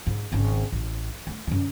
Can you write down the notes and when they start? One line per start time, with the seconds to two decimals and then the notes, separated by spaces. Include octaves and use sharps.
0.07 G#2
0.32 G#1 C#3
0.72 A1
1.27 A3
1.47 F#2 D3